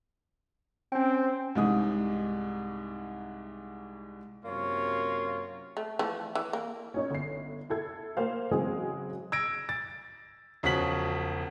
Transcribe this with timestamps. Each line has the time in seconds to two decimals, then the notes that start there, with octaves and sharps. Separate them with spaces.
0.92 C4 C#4 G5
1.55 C2 G#2 D#6
4.45 F#2 C3 A#3 F4 C#5
5.77 A3
5.99 E3 F3 A3
6.35 E3
6.53 A#3
6.94 C#4 D#4 C#5
7.11 G1 C7
7.70 E4 A4 G#6
8.17 A#3 C5 F5
8.51 C#3 E3 F#3 G#3 C4 G#4
9.32 E6 G#6 A#6 D7
9.69 A6
10.63 E1 C#3 F3 F#4 B6 F#7